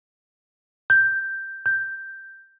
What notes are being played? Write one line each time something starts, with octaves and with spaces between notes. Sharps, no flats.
G6
G6